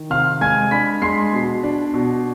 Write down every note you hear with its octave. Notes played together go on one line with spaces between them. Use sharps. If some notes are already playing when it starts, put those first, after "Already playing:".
Already playing: D#3
C3 F5 F6
G#3 G#5 G#6
D4 B5 B6
G#3 C6 C7
B2
D4
B2